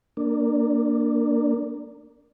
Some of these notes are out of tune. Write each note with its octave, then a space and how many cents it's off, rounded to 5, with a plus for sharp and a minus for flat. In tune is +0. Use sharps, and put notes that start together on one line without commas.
A#3 +0 D4 +0